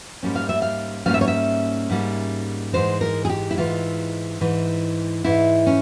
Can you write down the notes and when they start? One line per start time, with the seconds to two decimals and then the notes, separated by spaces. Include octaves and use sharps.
0.23 G#2 G3 A#3 C#4
0.35 F5
0.49 E5
0.62 F5
1.05 G#2 G3 A#3 C#4 F5
1.14 E5
1.21 C#5
1.28 E5
1.90 G#2 G3 A#3 C#4
2.73 G#2 E3 G#3 C5
3.01 A#4
3.25 G#4
3.29 G4
3.51 E4
3.57 G#2 E3 G#3 F4
4.41 G#2 E3 G#3
5.24 G#2 E3 G#3 E4
5.67 C#4